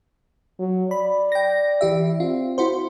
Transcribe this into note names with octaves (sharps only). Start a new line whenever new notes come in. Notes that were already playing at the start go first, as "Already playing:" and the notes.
F#3
D5 B5
G5 A#6
E3 G4 E5
C4 F4
E4 F#4 C5